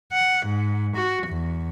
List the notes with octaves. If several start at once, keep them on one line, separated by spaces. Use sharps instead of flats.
F#5
G#2
F#4
E2